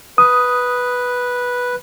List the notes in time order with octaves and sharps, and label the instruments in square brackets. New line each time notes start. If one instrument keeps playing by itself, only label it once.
[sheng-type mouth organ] B4 [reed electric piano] D#6